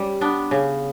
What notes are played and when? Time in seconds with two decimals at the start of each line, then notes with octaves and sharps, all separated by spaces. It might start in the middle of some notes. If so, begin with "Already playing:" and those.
Already playing: G3 C#4
0.21 B3 D4
0.51 C#3